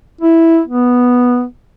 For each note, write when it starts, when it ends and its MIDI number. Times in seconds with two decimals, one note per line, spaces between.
0.21 0.60 64
0.68 1.44 59